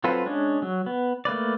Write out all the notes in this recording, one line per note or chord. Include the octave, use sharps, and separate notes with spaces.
F#3 C4 F4 A4 B4
G#3 C#4 D4
F#3
B3
A3 A#3 B4 D5